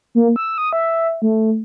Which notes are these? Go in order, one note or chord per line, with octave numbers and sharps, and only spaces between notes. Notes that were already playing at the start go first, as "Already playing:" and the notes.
A#3
E6
D#6
E5
A3